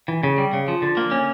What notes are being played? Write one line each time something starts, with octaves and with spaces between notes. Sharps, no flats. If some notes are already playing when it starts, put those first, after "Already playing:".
E3
C#3
G3
C#3
F3
D3
A#3
C#4